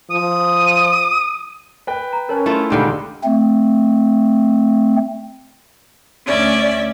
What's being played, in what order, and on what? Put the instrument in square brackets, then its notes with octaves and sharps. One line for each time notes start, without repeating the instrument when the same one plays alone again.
[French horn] F3 [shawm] D#6
[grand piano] B4 G5
[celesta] A#5
[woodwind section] C#4 [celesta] A#4 C#5 A5
[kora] A3 E4 F4
[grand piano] C#2 [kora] A#2 D3 D#3 [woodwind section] G4 F5 G5 [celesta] B5
[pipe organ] A3 C4
[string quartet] D2 C#4 D5 E5